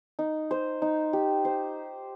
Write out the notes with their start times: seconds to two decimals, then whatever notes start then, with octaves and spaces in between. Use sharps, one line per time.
0.19 D#4
0.51 C5
0.82 D#4
1.13 G4
1.45 C5